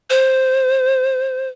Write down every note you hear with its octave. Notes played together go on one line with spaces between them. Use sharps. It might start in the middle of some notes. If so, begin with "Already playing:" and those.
C5